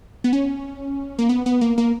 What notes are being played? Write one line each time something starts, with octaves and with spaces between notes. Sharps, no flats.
B3
C#4
A#3
B3
B3
A#3
A#3